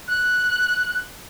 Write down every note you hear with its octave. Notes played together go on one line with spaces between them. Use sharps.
F#6